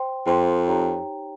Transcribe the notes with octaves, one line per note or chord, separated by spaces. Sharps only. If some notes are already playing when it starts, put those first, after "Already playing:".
Already playing: C5 G5 C6
F2 C5 G5 C6
D#4 G4 C#5 G5 A#5